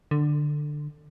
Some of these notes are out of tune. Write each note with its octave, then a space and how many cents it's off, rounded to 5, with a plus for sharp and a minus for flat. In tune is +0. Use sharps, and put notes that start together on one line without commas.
D3 +15